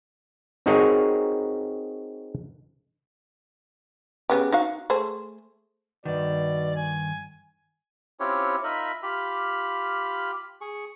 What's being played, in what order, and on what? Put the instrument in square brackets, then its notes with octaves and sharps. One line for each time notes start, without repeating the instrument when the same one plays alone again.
[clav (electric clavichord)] C4 D#4 F#4 G#4 A#4 C#5
[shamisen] C#3 B3 G4
D#4 F#4 F5
A3 G#4 C5
[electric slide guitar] G2 D#3 [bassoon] B2 [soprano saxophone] D5
[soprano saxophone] G#5
[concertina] C4 C#4 E4 F4 G4 C#5
D#4 F4 A#4 E5 B5
F4 G4 B5 F6
G#4 C#6